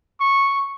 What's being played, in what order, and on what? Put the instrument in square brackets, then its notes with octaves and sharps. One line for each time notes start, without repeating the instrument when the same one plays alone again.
[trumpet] C#6